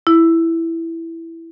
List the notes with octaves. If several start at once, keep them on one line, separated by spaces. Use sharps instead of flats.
E4